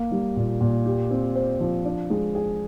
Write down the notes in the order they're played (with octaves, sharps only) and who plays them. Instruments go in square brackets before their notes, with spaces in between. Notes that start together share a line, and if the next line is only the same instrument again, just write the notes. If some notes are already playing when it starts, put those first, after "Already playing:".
Already playing: [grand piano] A#3
G3
A#2
A#2
G4
C4
C5
F3
D4
G#3
G#4